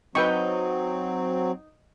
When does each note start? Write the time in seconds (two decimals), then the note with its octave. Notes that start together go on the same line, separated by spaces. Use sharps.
0.15 F#3 C4 D#4 B4 G5 C#6